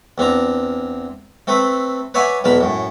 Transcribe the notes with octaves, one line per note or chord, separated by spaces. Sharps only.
E2 C4 D4 A#5
A3 C4 A4 B4
B4 C#5 D5 E5 F#5 G#5
B1 E2 A#4 A5 B5
F#2 A2